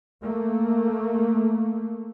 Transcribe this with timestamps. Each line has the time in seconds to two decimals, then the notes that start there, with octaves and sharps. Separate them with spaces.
0.23 A3 A#3